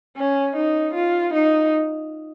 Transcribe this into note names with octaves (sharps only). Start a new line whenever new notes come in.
C#4
D#4
F4
D#4